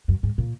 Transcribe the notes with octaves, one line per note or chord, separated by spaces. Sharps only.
F#2
G#2
A#2